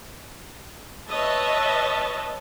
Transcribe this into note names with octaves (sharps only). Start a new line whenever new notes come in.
B4 C#5 D#5 E5 A5